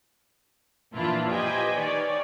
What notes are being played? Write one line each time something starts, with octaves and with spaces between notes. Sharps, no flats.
A#2 E3 F3 D4 E4 F4
G4 B4 C5 D#5 G5 G#5
D#3 C#5 D5